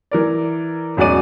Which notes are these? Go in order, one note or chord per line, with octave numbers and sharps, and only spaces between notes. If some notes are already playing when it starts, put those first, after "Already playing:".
E3 A#4 D5
E1 F#2 D#4 F#4 D5 D#7